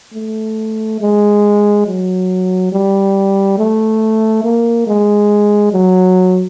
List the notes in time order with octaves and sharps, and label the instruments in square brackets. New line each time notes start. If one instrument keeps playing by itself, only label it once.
[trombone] A3
G#3
F#3
G3
A3
A#3
G#3
F#3